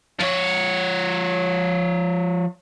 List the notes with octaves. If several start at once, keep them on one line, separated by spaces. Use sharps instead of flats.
F3 C#5